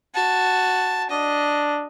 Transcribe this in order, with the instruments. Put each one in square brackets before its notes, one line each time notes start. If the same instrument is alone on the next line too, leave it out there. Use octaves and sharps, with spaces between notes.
[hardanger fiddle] F#4 A5
[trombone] D4 [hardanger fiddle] D#5